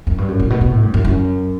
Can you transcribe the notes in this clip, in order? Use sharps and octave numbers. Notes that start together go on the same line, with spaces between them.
F#2
G2
F#2
A2
B2
B2
A2
G2
F#2
F#2